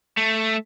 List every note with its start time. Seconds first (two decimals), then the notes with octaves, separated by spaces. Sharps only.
0.17 A3